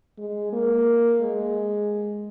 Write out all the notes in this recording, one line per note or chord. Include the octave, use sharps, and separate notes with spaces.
G#3
A#3
G#3